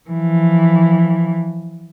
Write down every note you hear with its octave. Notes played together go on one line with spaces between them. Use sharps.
E3 F3